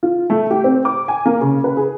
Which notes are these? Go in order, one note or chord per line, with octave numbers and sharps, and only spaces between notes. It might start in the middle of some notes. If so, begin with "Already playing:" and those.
F4
A3
G4
C4
D6
G#5
A#3
C#3
B4
G#4